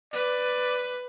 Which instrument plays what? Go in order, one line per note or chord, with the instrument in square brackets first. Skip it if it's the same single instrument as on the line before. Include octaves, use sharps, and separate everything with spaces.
[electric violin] B4 [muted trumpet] D5